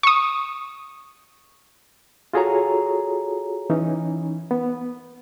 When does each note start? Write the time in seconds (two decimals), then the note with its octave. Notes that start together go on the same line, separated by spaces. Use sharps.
0.03 C#6 D#6
2.33 F4 F#4 G#4 A4 C#5 A#5
3.70 E3 C#4 D#4
4.51 B3